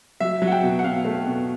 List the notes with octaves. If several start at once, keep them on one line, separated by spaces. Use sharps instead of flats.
F#3 E5
F#3
F#5
G5
B2
F#5
B2 F5
A3
B2